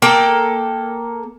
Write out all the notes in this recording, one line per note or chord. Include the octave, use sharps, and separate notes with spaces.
A#3 A4 G5